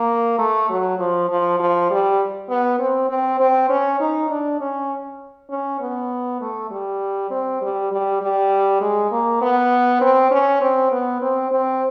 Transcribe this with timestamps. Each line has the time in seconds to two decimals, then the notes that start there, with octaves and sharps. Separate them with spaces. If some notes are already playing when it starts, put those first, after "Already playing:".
Already playing: A#3
0.39 A3
0.70 F#3
0.99 F3
1.29 F3
1.60 F3
1.90 G3
2.49 B3
2.79 C4
3.09 C4
3.40 C4
3.69 C#4
4.00 D#4
4.30 D4
4.60 C#4
5.50 C#4
5.80 B3
6.41 A3
6.70 G3
7.30 C4
7.61 G3
7.91 G3
8.21 G3
8.81 G#3
9.11 A#3
9.41 B3
10.01 C4
10.31 C#4
10.61 C4
10.92 B3
11.21 C4
11.51 C4